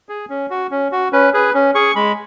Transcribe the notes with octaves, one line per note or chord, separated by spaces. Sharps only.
G#4
C#4
F#4
C#4
F#4
C#4 B4
G#4 B4
C#4
G#4 C#6
G#3 B5